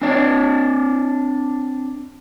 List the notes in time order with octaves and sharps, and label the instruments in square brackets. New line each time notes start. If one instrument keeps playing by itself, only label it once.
[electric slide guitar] C4 D4 D5